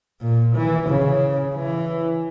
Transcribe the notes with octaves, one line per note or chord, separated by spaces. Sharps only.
A#2
E3
C#3
E3